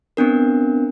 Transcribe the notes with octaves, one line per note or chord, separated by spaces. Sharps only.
B3 C4 D4 A#4